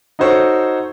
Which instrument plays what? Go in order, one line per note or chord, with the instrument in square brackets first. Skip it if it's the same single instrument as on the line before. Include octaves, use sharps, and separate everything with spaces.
[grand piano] D#4 F#4 A4 C5 C#5